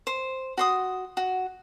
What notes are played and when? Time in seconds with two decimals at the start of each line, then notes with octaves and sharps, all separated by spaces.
0.07 C5
0.58 F#4 C6 D#6
1.17 F#4